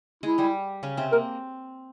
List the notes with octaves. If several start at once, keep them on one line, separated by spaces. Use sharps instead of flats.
G#3 E4 G#4
G3 G4
C#3 C#4
C3 C4
A#3 A#4